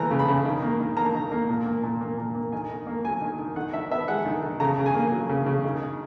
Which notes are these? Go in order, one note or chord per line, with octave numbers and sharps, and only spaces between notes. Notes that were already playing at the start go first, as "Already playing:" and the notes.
Already playing: E3 A#3 A#5
C#3
B5
C#3
D#3
A#3
D#3
A#3 A#5
D#3
A#3
A#2
A#3
A#2
A#3
A#2
A#3
D#3 G#5
D#3
A#3
F#3 G#5
D#3
D#3
D#3 F#5
D#3 E5
B3 E5
G#3 F#5
D#3
D#3
C#3 A#5
C#3
G#5
A#3
F#3
C#3
C#3
D#3
D#3